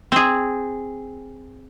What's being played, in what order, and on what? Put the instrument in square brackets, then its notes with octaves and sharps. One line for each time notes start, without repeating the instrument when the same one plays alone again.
[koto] C4 G#4